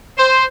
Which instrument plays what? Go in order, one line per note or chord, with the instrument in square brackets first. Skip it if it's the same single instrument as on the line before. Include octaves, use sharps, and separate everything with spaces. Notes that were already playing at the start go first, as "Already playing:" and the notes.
[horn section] C5